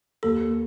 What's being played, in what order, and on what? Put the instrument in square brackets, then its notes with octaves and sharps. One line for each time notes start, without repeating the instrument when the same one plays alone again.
[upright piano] D#2 [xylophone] A4